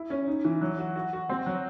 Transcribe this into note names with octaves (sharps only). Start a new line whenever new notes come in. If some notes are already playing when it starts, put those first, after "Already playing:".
Already playing: E4
C#4
D#4
E3
F#3
F#4
F#4
F#4
C4
F#3